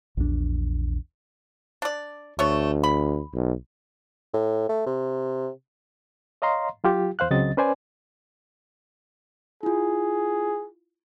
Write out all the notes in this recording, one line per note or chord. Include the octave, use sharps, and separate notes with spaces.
A#1 E2 F3 D4
D4 D5
D2 A3 B3 C#5
B5
B1
A2
A3
C3
C#5 D#5 F5 A#5 C6
F#3 F4 G4
E2 C5 F5 F#6
C#2 C#3 F#3 C4 D#5 A6
C#4 B4 C5 D5 G#5
E4 F4 G#4